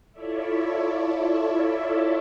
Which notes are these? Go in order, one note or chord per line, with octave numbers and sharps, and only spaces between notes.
E4 F4 A4 C#5 D5 E5